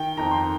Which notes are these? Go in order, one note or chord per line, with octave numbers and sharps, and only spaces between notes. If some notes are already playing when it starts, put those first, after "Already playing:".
Already playing: D#3 G5
F2 D#3 A#5
C6